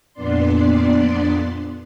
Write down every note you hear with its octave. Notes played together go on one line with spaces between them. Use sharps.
F2 A#2 B3 D4 D5 C6